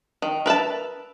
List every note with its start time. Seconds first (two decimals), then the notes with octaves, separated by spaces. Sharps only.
0.22 D#3
0.46 A#4 B4 E5 A5